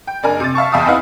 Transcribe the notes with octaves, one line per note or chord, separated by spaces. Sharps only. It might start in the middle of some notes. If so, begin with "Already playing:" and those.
G5
F#1 D4 A#4 G#5
C3 A6
E5 F5 A5 C#6
E2 E5 F5 G5 A5 D#6
C4 D#4 E4 B4 F5 F#5